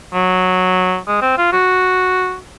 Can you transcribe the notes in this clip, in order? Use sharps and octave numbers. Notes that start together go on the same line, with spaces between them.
F#3
G#3
C4
F4
F#4